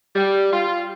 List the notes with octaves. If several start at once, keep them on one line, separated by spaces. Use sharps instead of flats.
G3
F4